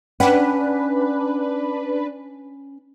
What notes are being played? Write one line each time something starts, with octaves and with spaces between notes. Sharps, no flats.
C#4 D4 B4 F#5 G5